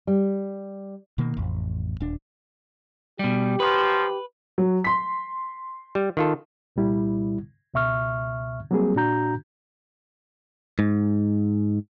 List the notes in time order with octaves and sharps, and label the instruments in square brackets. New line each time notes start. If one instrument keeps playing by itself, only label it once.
[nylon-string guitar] G3
[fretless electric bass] B2 D#3 A#3
A1 F2
D#1 D4
[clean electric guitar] B2 G3 [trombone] G4
[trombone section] F3 F#3 [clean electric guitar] B4
[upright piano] F#3
C6 B6
[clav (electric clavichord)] G3
D#3 F4 A4
[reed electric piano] C2 A#2 G3 E4
C#2 B2 E5 C#6 F6
F#3 G3 A#3 C4 G#4
A#2 D4 F#4 A#5 G6
[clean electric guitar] G#2